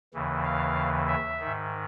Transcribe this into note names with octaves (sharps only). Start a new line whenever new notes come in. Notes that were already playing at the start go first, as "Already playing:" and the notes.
D#2 C#3 E3
F5
E5
G#2 D#3